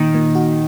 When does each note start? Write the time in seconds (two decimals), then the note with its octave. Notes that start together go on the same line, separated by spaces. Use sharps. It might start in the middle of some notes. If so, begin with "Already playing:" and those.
Already playing: A#2 D#3
0.14 A#2
0.35 F#4